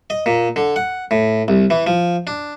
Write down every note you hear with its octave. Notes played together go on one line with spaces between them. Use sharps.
D#5
A#2
D3
F#5
A2
C2
E3
F3
D4